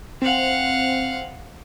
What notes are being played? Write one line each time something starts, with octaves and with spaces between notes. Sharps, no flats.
C4 F5 F#5